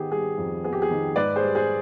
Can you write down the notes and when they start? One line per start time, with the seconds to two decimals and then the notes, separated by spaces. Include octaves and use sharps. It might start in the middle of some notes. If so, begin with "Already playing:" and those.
Already playing: D#3 B3 G4 G#4
0.12 G3 G#4
0.38 F2
0.64 B3 G#4
0.73 G4
0.82 G#4
0.91 D#3
1.16 G#2 B4 D5
1.36 G#4 C5
1.42 G3
1.55 G#4 C5